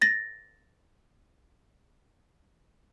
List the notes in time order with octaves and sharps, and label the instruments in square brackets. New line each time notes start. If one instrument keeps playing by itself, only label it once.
[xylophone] A6 A#6